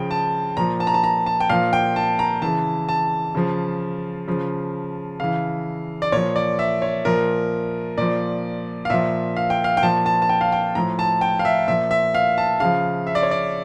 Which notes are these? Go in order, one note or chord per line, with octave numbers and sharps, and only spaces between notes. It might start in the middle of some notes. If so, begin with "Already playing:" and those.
Already playing: C#3 F3 G5
A5
A#2 F3 A#5
A5
A#5
A5
A#5
A5
G5
A#2 F3 F5
G5
A5
A#5
C#3 E3 A5
A5
C#3 F3
C#3 F3
C#3 E3 F5
D5
A#2 F3 C#5
D5
E5
C#5
A#2 F3 A#4
A#2 F3 D5
F5
A#2 F3 E5
F5
G5
F5
G5
A#2 F3 A5
A5
A5
G5
F5
G5
A2 F3 A#5
A5
G5
F5
E5
A#2 F3 E5
E5
F5
A5
C#3 F3 F5
E5
D5
C#5
D5